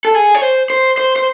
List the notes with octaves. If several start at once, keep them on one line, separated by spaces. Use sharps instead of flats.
A4
G#4
C#5
C5
C5
C5
C5